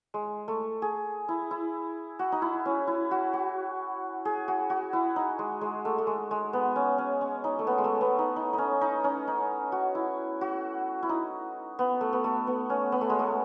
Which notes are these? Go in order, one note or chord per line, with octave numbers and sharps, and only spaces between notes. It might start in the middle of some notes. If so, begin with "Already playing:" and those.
G#3
A3
G#4
E4
E4
F#4
D#4
E4
C#4
E4
F#4
F#4
G#4
F#4
F#4
E4
D#4
G#3
G#3
A3
A3
G#3
G#3
B3
C#4
C#4
C#4
D#4
A3
B3
G#3
A3
B3
D#4
D#4
D#4
C#4
D#4
C#4
D#4
F#4
E4
F#4
E4
D#4
B3
A3
B3
A3
B3
C#4
B3
A3
G#3
A3